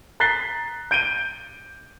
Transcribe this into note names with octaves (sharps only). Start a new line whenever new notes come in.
A#5 F#6 A6 B6 C7 G7
G6 D7 D#7 G7